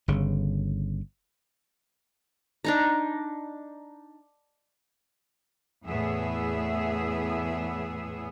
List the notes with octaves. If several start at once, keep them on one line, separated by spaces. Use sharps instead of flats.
G1 C#3
D4 D#4 A#5
E2 A2 B3 G#4 E5